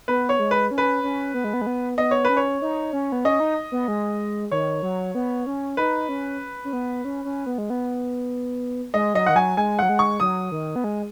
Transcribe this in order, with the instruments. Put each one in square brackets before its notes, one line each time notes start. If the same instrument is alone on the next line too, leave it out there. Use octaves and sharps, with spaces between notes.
[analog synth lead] B3 [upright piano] B4
[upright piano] C#5
[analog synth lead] G#3
[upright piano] B4
[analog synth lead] C#4
[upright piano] B4
[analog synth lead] C#4
B3
G#3
B3
G#3
B3
[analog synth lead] B3 [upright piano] D#5
[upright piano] C#5
[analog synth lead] C#4 [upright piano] B4
[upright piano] C#5
[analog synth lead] D#4
C#4
B3
[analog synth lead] C#4 [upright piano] D#5
[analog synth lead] D#4
B3
G#3
[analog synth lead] D#3 [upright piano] C#5
[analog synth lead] F#3
B3
C#4
[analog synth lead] D#4 [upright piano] B4
[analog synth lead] C#4
C#4
B3
C#4
C#4
B3
G#3
B3
[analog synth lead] G#3 [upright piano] D#5
[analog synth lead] F#3 [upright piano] D#5
[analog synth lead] D#3 [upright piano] F#5
[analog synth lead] F#3 [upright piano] G#5
[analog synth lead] G#3 [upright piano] G#5
[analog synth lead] F#3 [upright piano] F#5
[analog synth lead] G#3
[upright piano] C#6
[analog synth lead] F#3 [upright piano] D#6
[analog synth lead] D#3
B3
G#3